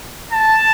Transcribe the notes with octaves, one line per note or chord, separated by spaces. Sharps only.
A5